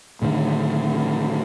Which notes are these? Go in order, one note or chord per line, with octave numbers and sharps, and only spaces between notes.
A2 D3 D#3